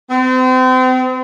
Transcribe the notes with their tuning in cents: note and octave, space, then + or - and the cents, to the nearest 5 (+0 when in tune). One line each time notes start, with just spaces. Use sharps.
C4 -35